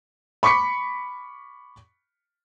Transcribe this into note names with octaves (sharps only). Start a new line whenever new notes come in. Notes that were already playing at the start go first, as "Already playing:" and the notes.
B5 C#6 D6 B6 C#7